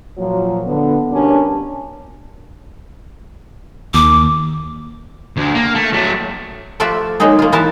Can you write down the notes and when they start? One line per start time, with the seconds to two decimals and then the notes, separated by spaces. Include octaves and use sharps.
0.17 A#2 F3 F#3
0.65 D3 B3
1.10 B2 G3 A#3 C#4 D4
3.94 D#2 D6
5.37 D2
5.55 A#3
5.75 A3
5.93 F#3 A3
6.80 F3 A3 F4 F#4 D5 E5
7.20 F#3 G#3 A#3 D#4 G#4
7.39 A#3 F4
7.52 E3 B3 E4 A#4 A5